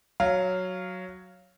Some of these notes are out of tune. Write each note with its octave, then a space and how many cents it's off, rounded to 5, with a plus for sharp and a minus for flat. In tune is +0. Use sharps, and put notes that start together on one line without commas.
F#3 +0 F5 +0